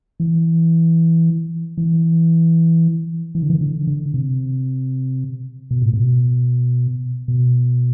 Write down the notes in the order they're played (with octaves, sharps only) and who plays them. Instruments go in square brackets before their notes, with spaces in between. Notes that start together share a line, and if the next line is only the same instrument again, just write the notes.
[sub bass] E3
E3
E3
D3
E3
D3
D3
C3
B2
A2
B2
B2